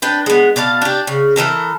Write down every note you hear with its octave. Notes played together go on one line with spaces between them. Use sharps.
D4 B4 G5
G#3 B3
B2 D5 F5 A5
D4 G4
C#3
E3 F3 A4 A#4